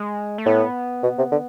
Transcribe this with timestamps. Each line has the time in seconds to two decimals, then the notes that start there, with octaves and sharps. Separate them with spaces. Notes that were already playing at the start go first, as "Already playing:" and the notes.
Already playing: G#3
0.38 A3
0.46 A2 B3
1.03 B2
1.18 C3
1.32 D3